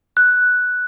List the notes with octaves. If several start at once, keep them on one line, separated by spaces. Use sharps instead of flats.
F#6